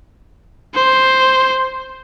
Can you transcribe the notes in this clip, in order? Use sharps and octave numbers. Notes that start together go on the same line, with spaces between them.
C5